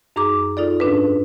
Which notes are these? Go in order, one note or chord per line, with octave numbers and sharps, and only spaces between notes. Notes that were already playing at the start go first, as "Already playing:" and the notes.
F#2 D#4 G#4 A#5 D6
D#4 F4 A4 D5
G#2 C#4 D4 B4
G#2